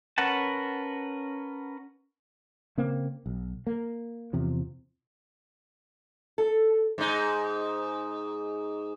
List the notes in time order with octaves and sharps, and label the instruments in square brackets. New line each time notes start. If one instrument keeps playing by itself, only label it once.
[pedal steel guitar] C#4 A#4 B4 F#5 A5
[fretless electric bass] C#3 A#3 C4
B1
A#3
E2 C3 F3
[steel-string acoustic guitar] A4
[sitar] G#2 D#4